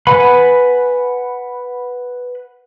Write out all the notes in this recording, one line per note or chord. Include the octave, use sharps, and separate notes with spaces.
B4 F#5 G#5 B5